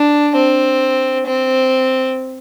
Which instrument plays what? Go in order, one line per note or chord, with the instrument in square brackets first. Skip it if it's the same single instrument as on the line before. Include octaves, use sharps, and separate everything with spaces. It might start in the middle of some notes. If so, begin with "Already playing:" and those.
Already playing: [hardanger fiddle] D4
C4
C4